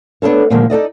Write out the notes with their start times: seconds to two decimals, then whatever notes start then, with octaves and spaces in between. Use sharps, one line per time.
0.22 B3 D4 F4 A4 C#5
0.50 A#2 D3 D#3 F3 G#3 A#3
0.70 D#4 A4 D5 D#5